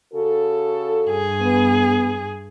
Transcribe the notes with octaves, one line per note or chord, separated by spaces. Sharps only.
C#3 F#4 A4
G2 G#4
B3